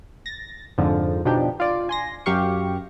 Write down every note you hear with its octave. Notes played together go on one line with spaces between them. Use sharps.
A6 A#6
F2 G#2 D3 F3
B2 F3 D4 D#4 G4
F4 D5
G#5 C6 A#6
F#2 G4 F5 C#6